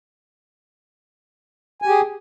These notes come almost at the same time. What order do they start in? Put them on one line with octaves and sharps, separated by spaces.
G#5 G4 G#4